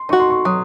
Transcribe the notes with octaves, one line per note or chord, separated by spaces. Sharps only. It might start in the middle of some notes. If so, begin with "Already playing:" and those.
Already playing: C6
D#4 F#4 C#6
C6
C#6
F#3 D#6